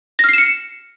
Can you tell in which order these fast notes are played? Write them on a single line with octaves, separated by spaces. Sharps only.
A#6 F6 C7 E7 C#7